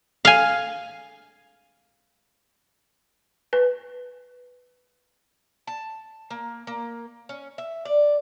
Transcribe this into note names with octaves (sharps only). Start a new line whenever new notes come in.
F5 G#5
B4
A5
A#3
A#3
C#4
E5
D5